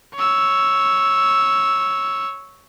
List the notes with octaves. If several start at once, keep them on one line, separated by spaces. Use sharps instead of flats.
C#5 E6